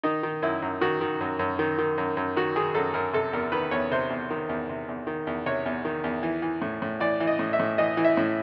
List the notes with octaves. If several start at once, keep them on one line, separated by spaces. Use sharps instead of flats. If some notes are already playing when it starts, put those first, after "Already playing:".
D#3 D#4
D#3
F#2 E4
F#2
D#3 F#4
D#3
F#2
F#2
D#3
D#3
F#2
F#2
D#3 F#4
D#3 G#4
F#2 A4
F#2 A#4
C3 A4
E2 A#4
D#3 B4
E2 C#5
C3 C5
E2
D#3
E2
C3
E2
D#3
E2
C3 C#5
E2
D#3
E2
E3
E3
A2
A2
E3 D5
E3
D#5
A2
E5
A2
E3 D#5
E3
E5
A2